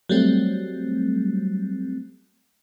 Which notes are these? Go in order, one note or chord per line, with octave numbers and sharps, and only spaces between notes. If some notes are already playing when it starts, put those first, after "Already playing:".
F#3 G3 A3 C4